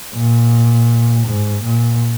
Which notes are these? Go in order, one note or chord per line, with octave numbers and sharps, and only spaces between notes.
A#2
G#2
A#2